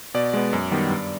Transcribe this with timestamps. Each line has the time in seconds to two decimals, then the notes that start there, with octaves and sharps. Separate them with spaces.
0.14 B2 D5
0.33 G#3 B3
0.53 F#2
0.72 D#3 G3 B3
0.90 G2